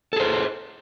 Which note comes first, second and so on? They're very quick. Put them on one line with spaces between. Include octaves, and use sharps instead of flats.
A4 G#4 C5